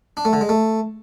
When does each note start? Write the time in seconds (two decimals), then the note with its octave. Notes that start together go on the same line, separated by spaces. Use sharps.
0.17 D4
0.25 A3
0.33 D3
0.41 G#3
0.49 A3